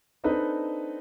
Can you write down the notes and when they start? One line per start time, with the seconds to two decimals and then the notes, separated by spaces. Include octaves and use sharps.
0.24 C4 D4 D#4 A4 B4 D#5